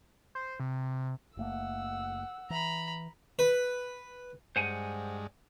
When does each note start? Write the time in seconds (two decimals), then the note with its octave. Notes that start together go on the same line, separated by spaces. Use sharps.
0.35 C5
0.60 C3
1.37 F#1 A3 A#3 F#5 E6
2.50 E3 A#5 B5
3.39 B4
4.56 G2 G#3 C5 F#5 G#5